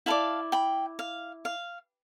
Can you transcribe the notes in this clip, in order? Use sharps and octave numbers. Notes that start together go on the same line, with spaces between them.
E4 B4 D5 F5 A5
G5 B5
F5
F5